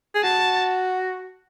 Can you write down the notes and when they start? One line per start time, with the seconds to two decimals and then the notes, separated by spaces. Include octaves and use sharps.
0.15 G#4
0.23 F#4 A5